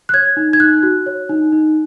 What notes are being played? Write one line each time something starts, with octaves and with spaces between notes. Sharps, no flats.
F#6
C#5 G#6
D#4
G#6
D#4 F#6
F#4
C#5
D#4
D#4